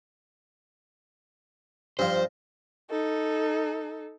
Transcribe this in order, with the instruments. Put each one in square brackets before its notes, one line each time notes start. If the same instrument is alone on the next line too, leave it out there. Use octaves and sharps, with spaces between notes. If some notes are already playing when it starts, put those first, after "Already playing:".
[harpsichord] G2 F3 [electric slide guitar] C5
[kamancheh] D#4 A4